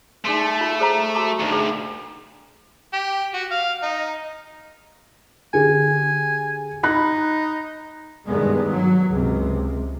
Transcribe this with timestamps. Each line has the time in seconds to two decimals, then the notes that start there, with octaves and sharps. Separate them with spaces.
0.25 A3 D#4 G#4 C6
0.61 F4
0.80 G#4 C5 A#5
1.15 F#4 A5 D6
1.40 D2 D#3
1.52 G#4
2.93 G4
3.34 F#4
3.51 F5
3.83 D#4
5.54 D3 G4 G#4 G#5
6.83 D#4 B5 F#6
8.26 G2 D#3 G#3 B3
8.69 F#3
9.12 C#2 C3